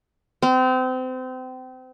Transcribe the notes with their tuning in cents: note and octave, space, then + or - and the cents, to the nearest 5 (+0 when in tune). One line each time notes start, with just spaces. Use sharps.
C4 -30